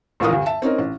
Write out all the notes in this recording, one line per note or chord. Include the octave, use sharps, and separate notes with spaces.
A#1 A2 E3 F4 A#4 D#6
D2 G2
E5 A5
C4 C#4 D#4 A#4
A1